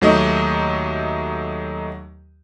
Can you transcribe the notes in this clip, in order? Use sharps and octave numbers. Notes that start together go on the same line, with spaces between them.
D#2 F#3 A3 D#4 D#5